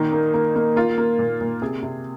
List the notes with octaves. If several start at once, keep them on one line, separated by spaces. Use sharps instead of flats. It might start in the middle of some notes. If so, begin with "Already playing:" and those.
Already playing: A#2 D#3 D#4
A#3
A#3
A#3
A#3 F4
A#3
A#2
A#2
C3 G#4
C3